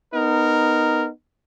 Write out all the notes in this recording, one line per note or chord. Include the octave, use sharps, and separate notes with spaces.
B3 D#4 A#4